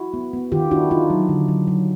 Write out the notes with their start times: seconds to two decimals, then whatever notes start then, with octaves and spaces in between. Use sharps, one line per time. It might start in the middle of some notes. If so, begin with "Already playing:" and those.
Already playing: E4 F#4
0.14 B3
0.33 B3
0.52 D#3 F4 G4
0.71 D4 E4 F#4
0.90 D4 D#4 F4
1.10 F#3
1.29 D3
1.48 F#3
1.68 F#3